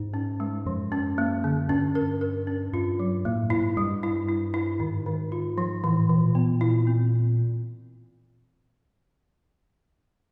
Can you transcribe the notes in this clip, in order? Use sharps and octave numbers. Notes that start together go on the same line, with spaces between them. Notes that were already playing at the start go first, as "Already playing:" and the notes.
Already playing: G#2 D#4
C#4
G#3
F#2 F3
C#4
A#3
D3
G2 C#4
A#4
A#4
C#4
G2 F4
F#3
A2 A#3
G#2 E4
G2 G3
E4
E4
E4
G#2 D#3
D#3
F4
F3
A2 E3
A#2 E3
A#2 B3
E4
C4